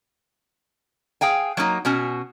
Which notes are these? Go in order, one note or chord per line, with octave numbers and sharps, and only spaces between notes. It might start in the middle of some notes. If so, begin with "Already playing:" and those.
G#4 F5 G5 G#5
F#3 A#3 D#4
B2 C#4 F#4 G#5